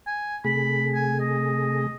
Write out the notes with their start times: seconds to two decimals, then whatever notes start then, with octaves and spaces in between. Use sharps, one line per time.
0.06 G#5
0.45 C3 A3 G#4 B5
0.94 G#5
1.20 D#5